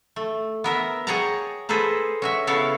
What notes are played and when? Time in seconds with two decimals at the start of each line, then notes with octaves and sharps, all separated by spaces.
0.16 A3
0.64 B3 A#4 E5
1.07 G#4 C#5 F#5 G5 A5 A#5
1.69 G#4 A4 B4 C5 A#5
2.22 C#4 F#4 E5
2.47 C#3 B3 E4 A4 C#5 F5